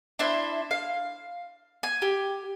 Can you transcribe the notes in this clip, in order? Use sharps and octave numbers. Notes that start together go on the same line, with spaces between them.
D4 E4 C5
F5
G#5
G4